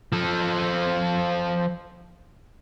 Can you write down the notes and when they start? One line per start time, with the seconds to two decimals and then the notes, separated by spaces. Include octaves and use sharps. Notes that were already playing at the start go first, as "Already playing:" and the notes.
0.13 F3 A4